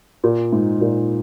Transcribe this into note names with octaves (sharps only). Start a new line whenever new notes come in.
A#2
G#2
A#2